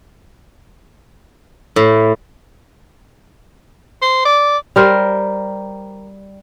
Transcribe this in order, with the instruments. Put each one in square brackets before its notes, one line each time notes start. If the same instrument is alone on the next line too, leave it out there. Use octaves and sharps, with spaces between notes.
[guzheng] A2
[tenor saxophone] C5
D5
[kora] G3 A#4 C5